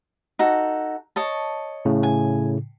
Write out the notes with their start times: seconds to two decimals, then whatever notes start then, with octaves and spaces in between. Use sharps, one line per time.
0.39 D#4 F#4 A4
1.16 C#5 D#5 A5
1.85 A2 C#3
2.03 G#5